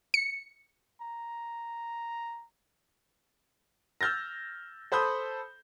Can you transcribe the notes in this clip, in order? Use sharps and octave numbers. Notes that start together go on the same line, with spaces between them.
C#7
A#5
E6 F6 G6 A6 A#6
A4 C5 B5 D#6 G6